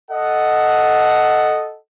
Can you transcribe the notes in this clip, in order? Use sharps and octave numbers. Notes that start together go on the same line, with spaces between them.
A4 D#5 F#5